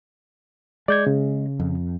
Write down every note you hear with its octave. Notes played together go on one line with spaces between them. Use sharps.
G#3 D5 G6 G#6
C#3
F2